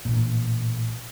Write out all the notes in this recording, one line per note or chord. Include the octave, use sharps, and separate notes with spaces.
A1 A#2